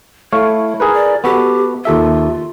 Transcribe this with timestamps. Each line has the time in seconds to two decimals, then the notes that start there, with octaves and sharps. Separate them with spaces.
0.33 A3 E4 C#5 F5
0.80 G#4 A#4 B4
0.93 D5
1.24 B3 F#4 G4 A4
1.85 D#2 F4 A4 E5